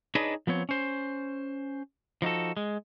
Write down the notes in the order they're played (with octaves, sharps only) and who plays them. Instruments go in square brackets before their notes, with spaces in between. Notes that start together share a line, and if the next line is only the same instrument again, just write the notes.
[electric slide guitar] D4 D#4 G#4 B4 C#5 D#5
F3 B3 C4 C#5
C#4 C5
F3 D#4 F#4 A4
G#3